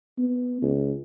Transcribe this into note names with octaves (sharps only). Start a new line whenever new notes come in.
B3
C#2